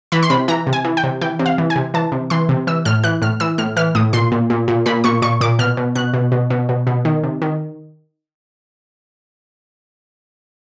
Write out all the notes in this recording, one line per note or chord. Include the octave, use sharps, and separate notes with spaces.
E3 B5
C6
C3 B5
E3 A#5
C3
G#5
E3
G5
C3
E3 G5
C3
F5
E3
G#5
C3
E3 A5
C3
E3 C6
C3
E3 E6
A2 F6
E3 F#6
A2 F6
E3 E6
A2 F6
E3 F6
A2 D#6
A#2 C6
A#2
A#2
A#2
A#2 B5
A#2 C#6
A#2 C#6
A#2 D6
B2 F6
B2
B2 F#6
B2
B2
B2
B2
B2
D#3
C3
D#3